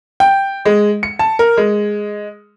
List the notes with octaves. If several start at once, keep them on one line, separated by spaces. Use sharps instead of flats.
G5
G#3
C#7
A5
A#4
G#3